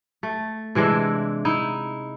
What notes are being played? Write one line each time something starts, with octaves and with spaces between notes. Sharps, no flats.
A3
C3 E3 G#3 D4
D#4 E4